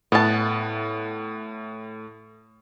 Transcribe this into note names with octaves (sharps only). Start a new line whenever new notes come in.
A2 B3 A5